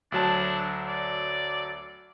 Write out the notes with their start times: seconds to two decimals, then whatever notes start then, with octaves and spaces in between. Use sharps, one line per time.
0.12 D2 F#3 D4 A5
0.88 D5